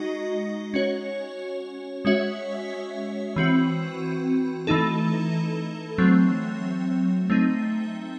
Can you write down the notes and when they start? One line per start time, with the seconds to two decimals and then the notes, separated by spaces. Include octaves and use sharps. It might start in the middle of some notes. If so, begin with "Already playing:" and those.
Already playing: G#3 D#4 F#4 D#5
0.74 C#4 F#4 C#5
2.05 G#3 C#4 F#4 C#5 E5
3.36 E3 C4 F#4
4.67 E3 A3 D#4 A4
5.98 F#3 A3 C4
7.30 A3 C4 D#4